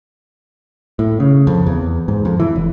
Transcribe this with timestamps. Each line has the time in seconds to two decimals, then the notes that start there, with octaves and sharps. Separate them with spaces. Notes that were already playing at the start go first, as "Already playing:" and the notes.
0.99 A2
1.20 C#3
1.47 F2
1.66 E2
2.08 G#2
2.25 F2
2.40 E3
2.56 F1